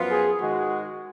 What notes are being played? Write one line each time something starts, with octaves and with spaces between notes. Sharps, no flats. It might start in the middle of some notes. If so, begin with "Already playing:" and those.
Already playing: F#2 F3 B3 F4
G#4
G#2 D#3 G#3 F#4